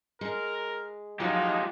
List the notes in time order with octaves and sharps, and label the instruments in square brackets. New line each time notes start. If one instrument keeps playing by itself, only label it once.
[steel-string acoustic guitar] G#3 [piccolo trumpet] A#4
[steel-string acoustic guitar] F3 F#3 [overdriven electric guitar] G#3 G4 [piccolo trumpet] D#4 [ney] F4